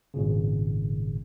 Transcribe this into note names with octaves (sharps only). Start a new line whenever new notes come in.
G#1 A#2 C#3